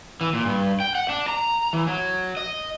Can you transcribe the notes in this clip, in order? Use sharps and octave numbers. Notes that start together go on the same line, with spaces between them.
E3
A#2
G2
G5
F#5
D4
A#5
E3
F#3
D#5